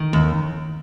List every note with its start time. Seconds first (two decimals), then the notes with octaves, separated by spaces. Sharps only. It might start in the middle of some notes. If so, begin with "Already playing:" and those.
Already playing: D#3
0.13 D#2